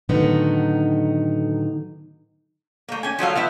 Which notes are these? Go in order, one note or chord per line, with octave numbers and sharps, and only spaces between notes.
A2 D3 D#3 F#3 B3 D#4
A3 A#3
C#4 G#5
F3 F#3 A3 F5
F3 B3 E4